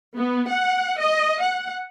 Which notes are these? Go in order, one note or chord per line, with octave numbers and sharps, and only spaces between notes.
B3
F#5
D#5
F#5